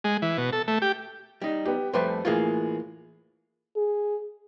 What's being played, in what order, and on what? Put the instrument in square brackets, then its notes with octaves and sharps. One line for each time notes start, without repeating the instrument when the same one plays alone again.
[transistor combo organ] G#3
E3
B2
A4
A3
G4
[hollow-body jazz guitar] G3 D#4
[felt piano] B3 G4
[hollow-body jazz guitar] F2 G3 A3 [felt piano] B4 C5
[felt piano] A2 G#4 [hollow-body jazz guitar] E3 A#3 F4
[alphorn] G#4